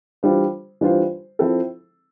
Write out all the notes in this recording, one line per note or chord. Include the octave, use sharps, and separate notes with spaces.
E3 G3 D4 F4 C5
E3 G3 D4 F4 C5
F3 C4 E4 A4